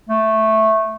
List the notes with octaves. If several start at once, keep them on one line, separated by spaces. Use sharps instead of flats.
A3